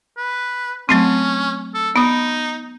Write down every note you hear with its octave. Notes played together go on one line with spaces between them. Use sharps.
B4
F#3 A3 C4 C#4
A4
B3 D#4 D#6